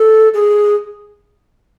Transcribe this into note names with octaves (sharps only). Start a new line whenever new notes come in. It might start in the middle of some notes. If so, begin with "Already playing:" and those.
Already playing: A4
G#4